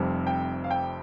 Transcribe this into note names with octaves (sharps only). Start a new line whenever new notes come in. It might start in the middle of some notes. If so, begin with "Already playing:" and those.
Already playing: F1 F2 C3 G3
G5
F5
G5